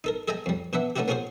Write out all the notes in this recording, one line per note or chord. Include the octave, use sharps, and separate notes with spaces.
D#4 A4 A#4
G#4 A4 D#5 G5 G#5 A#5
F2 G3
B2 D4 B4 E5 F#5
A3 C#4 D#4 E4 F#4 G4
A#3 C#4 F4 F#4 G#4 C5